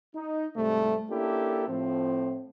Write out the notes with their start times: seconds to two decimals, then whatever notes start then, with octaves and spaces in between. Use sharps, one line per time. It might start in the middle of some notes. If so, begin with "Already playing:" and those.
0.15 D#4
0.57 C2 G#2 C3 G3 A3
1.10 A#3 C#4 D4 E4 G4 A4
1.68 A2 F3 C4